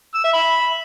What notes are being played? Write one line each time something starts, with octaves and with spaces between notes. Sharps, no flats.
E6
E5
B5